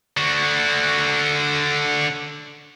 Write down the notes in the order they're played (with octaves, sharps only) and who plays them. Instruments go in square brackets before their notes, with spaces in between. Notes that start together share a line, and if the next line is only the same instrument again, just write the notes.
[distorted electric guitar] D3 F#4